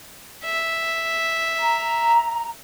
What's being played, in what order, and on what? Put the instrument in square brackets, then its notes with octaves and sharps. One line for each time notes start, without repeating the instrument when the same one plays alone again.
[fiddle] E5
[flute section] A#5